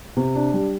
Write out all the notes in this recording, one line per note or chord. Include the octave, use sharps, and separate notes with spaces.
C3
D4
G3